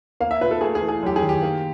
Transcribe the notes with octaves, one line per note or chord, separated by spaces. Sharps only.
A#3 F5
E5
A#2 B4
A4
A3 G#4
G#4
E3
G#4
F#2 G4
G#4
D#3
G4
A#3